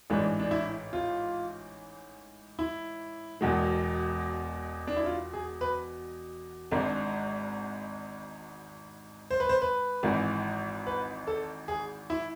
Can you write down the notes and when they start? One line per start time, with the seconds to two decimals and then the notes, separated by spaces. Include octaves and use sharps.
0.10 A1 G#2 E3 G#3 D4
0.39 D4
0.51 E4
0.93 F4
2.59 E4
3.41 E1 E2 B2 G#3
4.87 D4
4.97 E4
5.06 F4
5.33 G#4
5.61 B4
6.71 G#1 G#2 G#3 D4
9.31 C5
9.40 B4
9.49 C5
9.62 B4
10.03 G#1 G#2 E3
10.87 B4
11.27 A4
11.68 G#4
12.10 E4